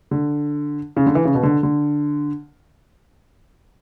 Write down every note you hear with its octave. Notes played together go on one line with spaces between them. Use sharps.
D3
C#3
D3
E3
C#3
B2
D3
D3